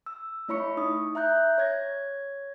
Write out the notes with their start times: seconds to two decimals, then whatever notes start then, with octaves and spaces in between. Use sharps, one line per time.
0.06 E6
0.48 A3 E4 C#5 B5 C#6 C#7
0.77 D#4 D#6
1.15 E5 A#5 F#6 G6
1.58 C#5 G#6 A#6